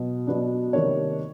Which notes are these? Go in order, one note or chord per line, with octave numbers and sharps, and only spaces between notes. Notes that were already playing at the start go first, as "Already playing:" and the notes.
Already playing: B2 F#3
B2 F#3 B3 D4
C3 D#3 G3 A#3 D4 C#5